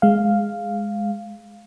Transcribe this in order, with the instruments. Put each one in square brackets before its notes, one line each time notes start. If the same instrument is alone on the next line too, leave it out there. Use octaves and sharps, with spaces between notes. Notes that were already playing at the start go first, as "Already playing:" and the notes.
[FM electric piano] G#3 F5